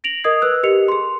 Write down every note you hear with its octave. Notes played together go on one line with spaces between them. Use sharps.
A#6 D7 F7 F#7
A#4 D#5 D#6 G#6 C7
B4 E6 F#6
G4 A#4 D#5 C#7 F7
G#4 C6